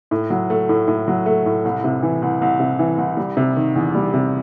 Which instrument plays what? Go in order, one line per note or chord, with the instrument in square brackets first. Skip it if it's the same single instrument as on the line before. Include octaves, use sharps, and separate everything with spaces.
[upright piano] A2
F#3
A3
A2
A2
F#3
A3
A2
C2
C3
E3
C2
C2
C3
E3
C2
G3
C3
D#3
E2
G3
C3